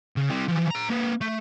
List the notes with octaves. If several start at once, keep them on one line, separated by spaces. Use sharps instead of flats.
C#3
G3 C4
E3 F3
C5 A#5
A#3 B4
A3